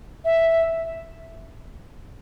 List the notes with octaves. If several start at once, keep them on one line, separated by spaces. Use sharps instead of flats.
E5